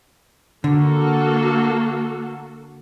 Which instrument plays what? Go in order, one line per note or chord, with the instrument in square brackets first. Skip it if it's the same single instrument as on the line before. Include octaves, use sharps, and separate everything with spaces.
[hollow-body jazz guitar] D3 [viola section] A#3 F#4 A4